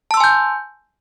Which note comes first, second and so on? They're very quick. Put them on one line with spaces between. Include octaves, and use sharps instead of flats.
A5 E6 C6 G#5 G6